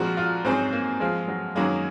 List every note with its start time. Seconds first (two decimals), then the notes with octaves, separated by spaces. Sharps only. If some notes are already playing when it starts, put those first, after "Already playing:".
Already playing: A#2 F3 G#3 C4 F#4
0.17 F4
0.44 G#2 F#3 C4 C#4 G#4 C5
0.73 A#3
1.00 F3 G#3 C4 F4
1.28 F#3
1.55 F#2 D#3 F#3 G#3 A#3